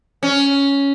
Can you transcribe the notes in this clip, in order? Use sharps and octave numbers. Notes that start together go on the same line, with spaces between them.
C#4